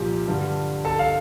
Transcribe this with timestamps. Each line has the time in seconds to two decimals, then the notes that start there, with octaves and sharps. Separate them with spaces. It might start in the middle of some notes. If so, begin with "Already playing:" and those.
Already playing: C2 A#2 F3 G4 G5
0.27 G2 D3 G3
0.85 A4 A5
0.99 F5